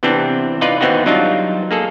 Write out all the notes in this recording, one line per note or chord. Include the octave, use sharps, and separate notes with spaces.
C3 E3 B3 C4 D4
D#4 F4 B4 D5
D#2 E3 B3 C4 D#4 F#4
F#3 G3 D4 D#4 F4
A#3 G#4 A4